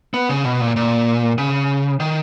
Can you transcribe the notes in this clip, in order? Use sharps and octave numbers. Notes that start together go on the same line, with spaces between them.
B3
C#3
B2
A#2
A#2
C#3
D#3